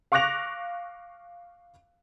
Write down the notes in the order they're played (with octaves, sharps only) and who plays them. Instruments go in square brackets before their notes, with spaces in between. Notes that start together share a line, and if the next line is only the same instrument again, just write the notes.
[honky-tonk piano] F5 C#6 D6 F#6 A#6 F7